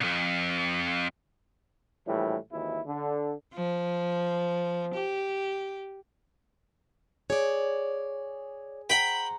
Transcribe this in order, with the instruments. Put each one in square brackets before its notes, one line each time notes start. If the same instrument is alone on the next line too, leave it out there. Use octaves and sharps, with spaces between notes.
[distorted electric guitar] C2 F2
[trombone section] A#1 A2 E3 G3
G#1 D#2 E3 E4
D3
[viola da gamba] F3
G4
[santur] G#4 [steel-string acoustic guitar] C#5 D5
[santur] C5 F#5 A#5 [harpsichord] G5 B5